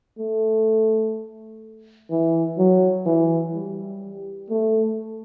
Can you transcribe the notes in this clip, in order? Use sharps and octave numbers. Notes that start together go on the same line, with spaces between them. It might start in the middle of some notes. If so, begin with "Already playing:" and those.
A3
E3
F#3
E3
G3
A3